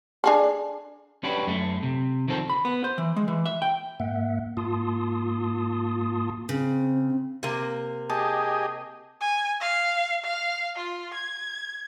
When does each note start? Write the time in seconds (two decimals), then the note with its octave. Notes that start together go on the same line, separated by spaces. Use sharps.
0.24 D4 G#4 A4
1.24 C#4 D4 F#4 G4 B4
1.47 F#2 A3
1.83 C3
2.28 D#3 F3 C4 A4
2.50 B5
2.65 B3
2.84 C5
2.98 E3
3.16 G#3
3.28 E3
3.46 E5
3.62 G5
4.00 G#2 A#3 E5 F#5
4.57 G#2 A#3 F4 A5 C6 D#6
6.49 C#3 C4
7.43 C3 A#3
8.10 G4 G#4 D#5 A5
9.21 G#5
9.61 F5
10.24 F5
10.76 F4
11.14 G#6